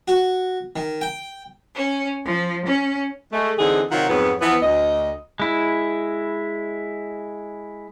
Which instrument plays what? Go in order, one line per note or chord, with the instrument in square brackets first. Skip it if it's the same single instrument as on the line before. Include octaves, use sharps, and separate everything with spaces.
[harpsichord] F#4
D#3
G5
[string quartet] C#4
F3
C#4
[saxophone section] G#3 A3
D3 E3 C4 D#4 G#4
C3 D#3 F#3 F4 F#5
F2 G#2 F#3 B3
E3 F3 B3
D2 D#5
[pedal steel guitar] G#3 E4